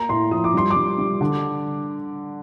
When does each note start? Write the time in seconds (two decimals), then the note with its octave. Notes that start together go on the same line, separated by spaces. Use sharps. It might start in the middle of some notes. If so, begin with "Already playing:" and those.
Already playing: A#3 A#5
0.09 A2 C6
0.31 F3 D#6
0.44 D6
0.54 G3 C6
0.70 D6
0.76 G3
0.98 G3
1.21 D3